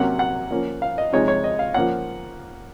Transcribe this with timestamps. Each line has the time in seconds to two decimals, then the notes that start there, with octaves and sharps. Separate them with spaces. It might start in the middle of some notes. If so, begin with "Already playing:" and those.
Already playing: C3 F#3 A#3 C#4 F#5
0.19 F#5
0.51 F3 A#3 C#4
0.82 F5
0.98 D#5
1.13 C3 F3 G#3 D#4 C#5
1.28 C#5
1.44 D#5
1.59 F5
1.74 F3 A#3 C#4 F#5